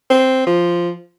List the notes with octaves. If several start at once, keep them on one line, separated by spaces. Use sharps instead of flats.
C4
F3